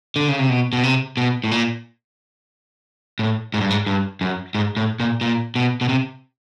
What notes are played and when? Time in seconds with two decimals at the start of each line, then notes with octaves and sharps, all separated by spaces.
0.16 D3
0.28 C#3
0.39 C3
0.50 B2
0.73 B2
0.83 C3
1.17 B2
1.44 A2
1.51 A#2
3.19 A2
3.54 G#2
3.61 G2
3.71 G#2
3.86 G2
4.21 F#2
4.55 G#2
4.77 A2
5.00 A#2
5.21 A#2
5.56 B2
5.81 B2
5.89 C3